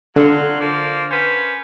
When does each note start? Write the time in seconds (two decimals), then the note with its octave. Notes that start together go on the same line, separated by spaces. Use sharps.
0.16 D3 F#3 F4 F#4
0.60 F3 A#3 D5
1.11 C#4 B4 C5